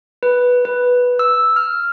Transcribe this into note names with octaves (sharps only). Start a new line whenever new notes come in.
B4
B4
E6
F6